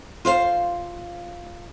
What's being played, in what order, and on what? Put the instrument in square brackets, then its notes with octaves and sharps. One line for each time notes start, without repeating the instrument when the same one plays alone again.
[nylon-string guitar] F4 C5 F5